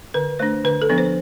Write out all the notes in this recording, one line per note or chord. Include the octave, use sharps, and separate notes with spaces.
D3 B4
A3 D4 C5
D3 B4
A4
F3 B3 D4
C5